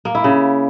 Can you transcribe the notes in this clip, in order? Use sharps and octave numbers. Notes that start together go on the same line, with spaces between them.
A#3
E4
C#3